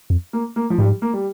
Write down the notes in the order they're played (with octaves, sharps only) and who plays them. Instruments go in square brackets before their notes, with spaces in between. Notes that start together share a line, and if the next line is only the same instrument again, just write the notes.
[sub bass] F2
[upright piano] A#3
A#3
F3
[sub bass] G#2 [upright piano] G3
[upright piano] A#3
G3